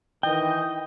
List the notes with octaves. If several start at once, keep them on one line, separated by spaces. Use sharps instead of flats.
D#3 E3 D#5 G5